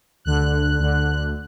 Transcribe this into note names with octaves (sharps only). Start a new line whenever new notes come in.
D2 D3 F#6
D2 D3